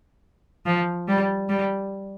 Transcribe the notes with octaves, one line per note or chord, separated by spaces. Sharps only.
F3
G3
G3